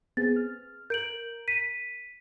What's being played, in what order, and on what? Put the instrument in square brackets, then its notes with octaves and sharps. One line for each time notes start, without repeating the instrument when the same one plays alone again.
[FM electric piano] B3 C4 G#4 [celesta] A6
[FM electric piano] F6
[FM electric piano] A#4 [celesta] G6 D7 F#7
[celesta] B6 D#7